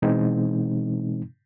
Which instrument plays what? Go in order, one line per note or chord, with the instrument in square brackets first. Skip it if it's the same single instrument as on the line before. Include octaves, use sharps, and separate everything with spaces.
[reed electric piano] B2 E3 G#3 C4 D#4